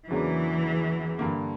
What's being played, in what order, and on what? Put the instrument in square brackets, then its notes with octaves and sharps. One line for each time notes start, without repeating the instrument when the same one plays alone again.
[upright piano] E2 C#3 F#3 A#3 D4 [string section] E3
[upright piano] G2 D3 A#3